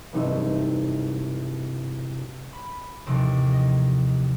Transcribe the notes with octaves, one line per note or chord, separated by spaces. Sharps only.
E1 G2 C3 D#4 F#4 D#7
B5
A1 D#2 C3 F3
D#5